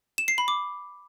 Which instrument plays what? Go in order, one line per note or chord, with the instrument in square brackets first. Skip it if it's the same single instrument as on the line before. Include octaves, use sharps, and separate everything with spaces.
[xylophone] E7
C7
B5
D6